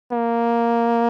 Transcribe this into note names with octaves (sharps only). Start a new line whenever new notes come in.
A#3